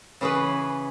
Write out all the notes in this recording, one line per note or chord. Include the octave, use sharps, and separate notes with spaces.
C#3 E3 C#4 G#4 B4